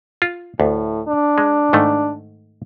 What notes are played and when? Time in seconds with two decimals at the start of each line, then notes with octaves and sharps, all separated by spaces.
0.22 F4
0.60 D2 A2
1.08 D4
1.38 G#3
1.73 G#2 D#3 A3